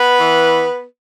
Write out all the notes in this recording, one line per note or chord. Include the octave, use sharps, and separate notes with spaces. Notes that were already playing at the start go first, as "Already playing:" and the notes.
Already playing: B3 B4
E3